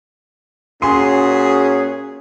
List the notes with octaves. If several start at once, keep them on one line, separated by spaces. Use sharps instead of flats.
A#2 C#4 F#4 G#4 G#5 C6